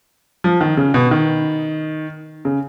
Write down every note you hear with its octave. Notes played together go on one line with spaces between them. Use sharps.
F3
D#3
C#3
B2
D#3
C#3